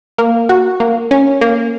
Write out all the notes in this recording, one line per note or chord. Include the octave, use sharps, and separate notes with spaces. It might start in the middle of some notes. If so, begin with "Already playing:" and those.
A#3
F#4
A#3
C#4
A#3